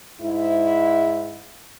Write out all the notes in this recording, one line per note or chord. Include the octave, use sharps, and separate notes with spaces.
G#2 E4